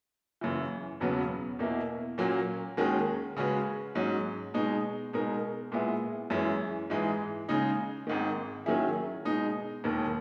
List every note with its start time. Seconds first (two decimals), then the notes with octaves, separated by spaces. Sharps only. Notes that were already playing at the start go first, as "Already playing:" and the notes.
0.41 F#2 C#3 E3
1.00 E1 E2 C#3 F#3 B3
1.59 E2 B2 A#3 E4
2.18 A#2 F#3 A#3 C#4
2.77 D#2 D#3 G#3 C#4 F#4
3.36 C#3 G#3 C#4 F#4 B4
3.95 G#2 F#3 C#4
4.54 B2 G#3 D#4
5.13 B2 G#3 D#4 A#4
5.72 A#2 G#3 B3 E4
6.30 F#2 E3 G#3 C#4 E4
6.90 G#2 E3 G#3
7.48 C#3 G#3 D#4 G#4
8.07 G#1 G#2 D#3
8.66 D#3 F#3 C#4 E4 G#4
9.25 B2 G#3 D#4
9.84 E1 D#2 D#3